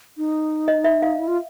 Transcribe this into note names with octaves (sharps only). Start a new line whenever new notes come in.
D#4
D#5
E5
F5
E4
F4